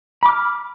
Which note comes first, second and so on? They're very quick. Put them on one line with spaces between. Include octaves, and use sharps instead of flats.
B5 D6 F6